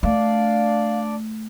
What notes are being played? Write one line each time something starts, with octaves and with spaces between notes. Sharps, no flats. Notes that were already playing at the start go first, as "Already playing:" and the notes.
A3 D4 D5 F5